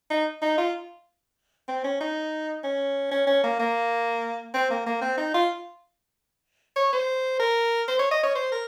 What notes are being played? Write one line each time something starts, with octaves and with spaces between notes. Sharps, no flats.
D#4
D#4
F4
C4
C#4
D#4
C#4
C#4
C#4
A#3
A#3
C4
A#3
A#3
C4
D#4
F4
C#5
C5
A#4
C5
C#5
D#5
C#5
C5
A#4